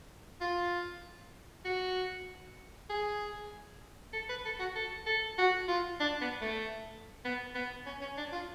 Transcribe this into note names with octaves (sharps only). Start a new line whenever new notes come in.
F4
F#4
G#4
A4
B4
A4
F#4
A4
A4
F#4
F4
D4
B3
A3
B3
B3
C#4
C#4
D4
F4